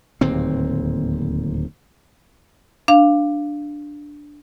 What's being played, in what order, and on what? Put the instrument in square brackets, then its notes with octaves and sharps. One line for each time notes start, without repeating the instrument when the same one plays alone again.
[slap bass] D1 D#2 A#2 C4
[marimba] D4 F5